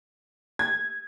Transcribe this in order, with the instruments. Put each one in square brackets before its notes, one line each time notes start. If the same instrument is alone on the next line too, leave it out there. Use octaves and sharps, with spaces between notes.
[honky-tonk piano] G#6